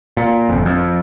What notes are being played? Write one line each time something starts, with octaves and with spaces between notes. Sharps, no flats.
A#2
G1 F2
F2